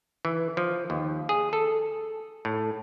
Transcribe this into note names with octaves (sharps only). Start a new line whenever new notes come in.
E3
F3
D#2
G#4
A4
A2